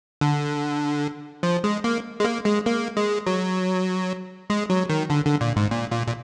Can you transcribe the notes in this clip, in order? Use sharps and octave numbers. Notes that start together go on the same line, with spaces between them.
D3
F3
G#3
A#3
G#3
A#3
G#3
A#3
G#3
F#3
G#3
F#3
D#3
D3
D3
A#2
G#2
A#2
A#2
A#2